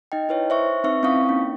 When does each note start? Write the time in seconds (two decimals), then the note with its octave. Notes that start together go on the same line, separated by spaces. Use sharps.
0.12 D#4 D#5 G5
0.29 E4 B4 C#5
0.50 C5 E5 C#6
0.84 C4 D#4 B4 E5 C#6
1.03 C4 C#4 E4 F5 C#6 D#6
1.29 A#3 C#4 D#4